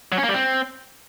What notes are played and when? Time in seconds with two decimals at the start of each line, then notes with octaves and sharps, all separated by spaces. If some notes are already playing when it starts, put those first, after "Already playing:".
0.12 F#3
0.18 C#4
0.23 A#3
0.29 G3
0.34 C4